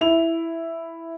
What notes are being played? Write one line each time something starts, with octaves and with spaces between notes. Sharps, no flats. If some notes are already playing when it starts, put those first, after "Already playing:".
E4 F7